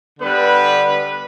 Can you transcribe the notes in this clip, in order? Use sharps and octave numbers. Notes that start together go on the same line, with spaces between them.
D3 G3 B3 B4